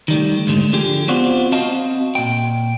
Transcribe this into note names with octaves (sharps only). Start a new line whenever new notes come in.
D#3 G3 A3
D2 G#2 D3 A3
D3 F3 G4 G#4
B3 C4 F4 F#4 C5 D5
C4 F#4 D#5 F5 A5
A#2 G5